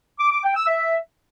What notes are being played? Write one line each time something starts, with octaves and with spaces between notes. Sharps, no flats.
D6
D6
G5
E6
E5